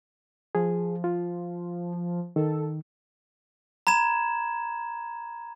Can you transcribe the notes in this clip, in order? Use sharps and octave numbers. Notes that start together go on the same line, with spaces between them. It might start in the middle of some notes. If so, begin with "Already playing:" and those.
F3 G#4
F4
D#3 A4
A#5 B5 G#6 E7